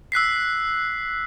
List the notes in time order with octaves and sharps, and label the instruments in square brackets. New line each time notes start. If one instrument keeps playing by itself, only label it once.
[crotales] E6 F#6 B6 C7